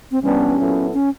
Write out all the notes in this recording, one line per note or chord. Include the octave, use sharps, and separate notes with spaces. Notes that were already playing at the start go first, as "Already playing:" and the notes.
C4
C3 E3 G3 B3 C#4 D4
A#2 F#3 B3 E4 A4
C#4